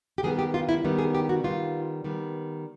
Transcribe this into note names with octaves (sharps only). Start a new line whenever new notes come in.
G4
D#3 G3 B3 G#4
G4
F4
E4
D#3 G3 B3
G#4
G4
F#4
D#3 G3 B3 F4
D#3 G3 B3